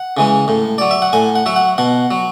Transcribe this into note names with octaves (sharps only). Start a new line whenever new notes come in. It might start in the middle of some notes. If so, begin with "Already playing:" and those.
Already playing: F#5
C#3 E3 G#3
A2
F#3 D5
E5
F#5
A2 G#5
F#5
F#3 E5
F#5
B2 F#5
F#3